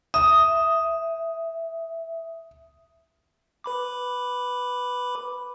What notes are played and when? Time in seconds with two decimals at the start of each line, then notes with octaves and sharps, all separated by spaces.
0.14 E5 D#6
3.64 B4 B5 D6